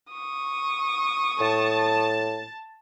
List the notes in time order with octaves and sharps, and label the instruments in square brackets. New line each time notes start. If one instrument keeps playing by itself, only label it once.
[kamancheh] C#6 D#6
[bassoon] A2 [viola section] A5